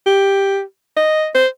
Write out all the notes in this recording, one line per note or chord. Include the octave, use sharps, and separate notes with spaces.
G4
D#5
C5